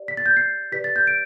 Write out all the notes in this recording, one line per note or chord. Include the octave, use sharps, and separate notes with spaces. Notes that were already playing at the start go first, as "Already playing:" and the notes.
Already playing: G4 D5
B6
A6
G6
C7
G4 B4 D5 B6
A6
G6
D7